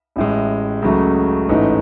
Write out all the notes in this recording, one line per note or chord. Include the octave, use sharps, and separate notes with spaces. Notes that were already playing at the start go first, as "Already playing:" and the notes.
A1 A2 G#3
C#2 C#3 F#3 A3
A1 G#2 E3 A3 D#4